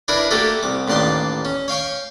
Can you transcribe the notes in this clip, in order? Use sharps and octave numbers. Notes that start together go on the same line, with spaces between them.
D4 E4 A#4 B4
A3 A#3 F#4 G4 A4
C2 D6
A1 D#2 D5 A5 C6
C#4
C#5 F5 G5 C#6